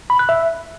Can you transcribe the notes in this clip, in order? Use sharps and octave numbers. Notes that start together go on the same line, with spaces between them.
B5
F#6
E5